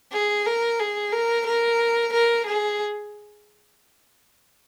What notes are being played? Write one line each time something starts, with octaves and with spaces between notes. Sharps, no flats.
G#4
A#4
G#4
A#4
A#4
A#4
G#4